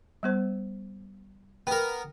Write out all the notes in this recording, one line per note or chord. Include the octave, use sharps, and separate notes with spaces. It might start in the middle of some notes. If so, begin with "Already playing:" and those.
G3 B3 C5
B3 A#4 G5